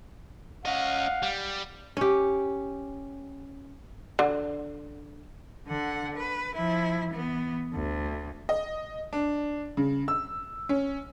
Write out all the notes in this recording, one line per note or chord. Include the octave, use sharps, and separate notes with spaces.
C#4 D#5 F5 F#5
G3
C#4 G4
D3
D3 F#5
B4
F3 E4
E3 B3
D2
D#5
D4
C#3
E6
C#4